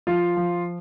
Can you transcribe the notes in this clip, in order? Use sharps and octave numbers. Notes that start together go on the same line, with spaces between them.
F3 F4 F5
F3